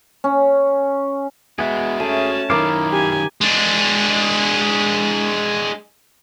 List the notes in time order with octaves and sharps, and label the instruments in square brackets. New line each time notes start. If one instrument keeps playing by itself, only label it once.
[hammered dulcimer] C#4
[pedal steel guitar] G#3 B3 G#4 [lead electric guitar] F#4 E5
[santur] A3 [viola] C#4 A5 [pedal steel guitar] G#4
[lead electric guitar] F#2 D#3 [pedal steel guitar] E4 F5 [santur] A#4 D6
[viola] G4 G#5
[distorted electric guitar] G#3 D4